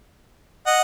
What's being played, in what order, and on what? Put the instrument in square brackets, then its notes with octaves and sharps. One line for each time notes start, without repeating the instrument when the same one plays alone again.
[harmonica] D#5 F#5